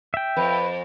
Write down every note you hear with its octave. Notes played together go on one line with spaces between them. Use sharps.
E5 G5
F2 B4